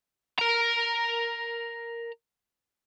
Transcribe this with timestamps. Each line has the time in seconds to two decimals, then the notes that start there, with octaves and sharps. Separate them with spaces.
0.39 A#4 A#5